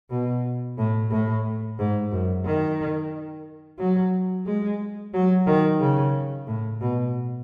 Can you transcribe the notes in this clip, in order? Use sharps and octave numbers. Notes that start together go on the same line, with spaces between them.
B2
A2
A2
G#2
F#2
D#3
F#3
G#3
F#3
D#3
C#3
A2
B2